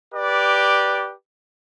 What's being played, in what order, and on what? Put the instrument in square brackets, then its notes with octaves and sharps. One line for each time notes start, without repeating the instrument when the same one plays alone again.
[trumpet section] G4 B4 D5